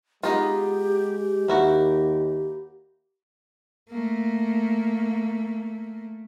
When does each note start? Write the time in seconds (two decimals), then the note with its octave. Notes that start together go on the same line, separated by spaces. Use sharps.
0.23 G#3 B3 D#4 F4 G4
1.48 D#2 A#3 E4 F#4
3.89 A3 A#3